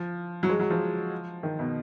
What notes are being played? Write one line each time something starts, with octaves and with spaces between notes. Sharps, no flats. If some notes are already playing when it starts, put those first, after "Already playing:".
Already playing: F3
F#3
G#3
F#3
F3
D#3
B2